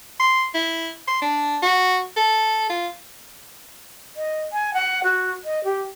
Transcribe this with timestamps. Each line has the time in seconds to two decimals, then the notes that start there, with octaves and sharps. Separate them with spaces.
0.20 C6
0.55 E4
1.08 C6
1.22 D4
1.62 F#4
2.16 A4
2.70 F4
4.16 D#5
4.53 G#5
4.74 F#5
5.04 F#4
5.45 D#5
5.64 G4